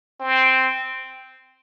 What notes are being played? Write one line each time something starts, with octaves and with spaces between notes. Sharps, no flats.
C4